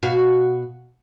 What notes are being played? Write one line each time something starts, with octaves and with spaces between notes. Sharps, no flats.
B2 F#4 F5